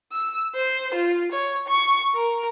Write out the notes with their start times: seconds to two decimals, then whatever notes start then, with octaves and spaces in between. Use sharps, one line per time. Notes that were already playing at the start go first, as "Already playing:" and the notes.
0.12 E6
0.54 C5
0.94 F4
1.32 C#5
1.68 C#6
2.15 A#4